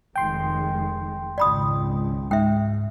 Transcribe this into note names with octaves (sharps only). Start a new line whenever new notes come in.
F1 D#3 G#3 G5 C6
G#1 C#2 D5 B5 D#6
G#2 E5 G5